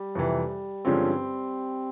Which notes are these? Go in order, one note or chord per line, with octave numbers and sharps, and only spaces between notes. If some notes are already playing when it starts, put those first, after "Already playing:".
Already playing: G3
F2 C3 E3
G2 D3 F3 G#3 C4 C#4